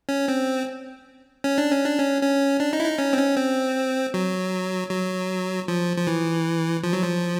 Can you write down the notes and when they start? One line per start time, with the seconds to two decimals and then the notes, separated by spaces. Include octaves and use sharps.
0.09 C#4
0.28 C4
1.44 C#4
1.58 D4
1.72 C#4
1.85 D4
1.99 C#4
2.22 C#4
2.60 D4
2.73 D#4
2.80 E4
2.85 D#4
2.98 C#4
3.13 C4
3.17 C#4
3.37 C4
4.14 F#3
4.91 F#3
5.68 F3
5.97 F3
6.07 E3
6.84 F3
6.93 F#3
7.02 F3